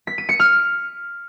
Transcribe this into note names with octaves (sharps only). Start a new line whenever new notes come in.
B6
D#7
C#7
F6